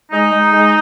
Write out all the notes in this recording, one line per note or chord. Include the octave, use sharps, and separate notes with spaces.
G#3 D#4
G#3
G#3